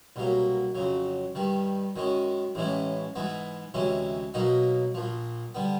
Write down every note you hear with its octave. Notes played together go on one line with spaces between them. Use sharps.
C2 B2 F#3 A#3
F2 C#3 F#3
G2 D#3 G3
F#2 D#3 G#3 C#4
A1 A2 E3 G#3 C#4
G#2 E3 G#3 B3
D2 C3 E3 G#3 C#4
B1 B2 F#3 A#3 D#4
A#1 A#2 F3
D3 G3 B3